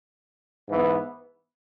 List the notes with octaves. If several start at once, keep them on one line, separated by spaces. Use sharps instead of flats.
G#2 E3 B3